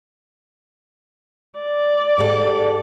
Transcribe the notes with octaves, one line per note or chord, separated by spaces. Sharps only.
D5
G#2 G4 A4